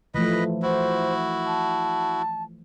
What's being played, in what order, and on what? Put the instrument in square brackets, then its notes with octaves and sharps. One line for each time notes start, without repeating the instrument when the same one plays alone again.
[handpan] E3 F3 A3 [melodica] B4 D#5 B5
[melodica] E4 F#4 [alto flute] C5
[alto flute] A5